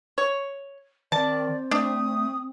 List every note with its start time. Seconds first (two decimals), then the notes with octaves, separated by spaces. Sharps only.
0.18 C#5
1.12 D#3 C4 D5 A5
1.71 A3 D4 D#6